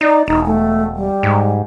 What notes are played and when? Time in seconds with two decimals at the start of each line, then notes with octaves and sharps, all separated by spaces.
0.01 D#4 D5
0.28 E1 D#4
0.46 A3
0.95 G3
1.23 G#2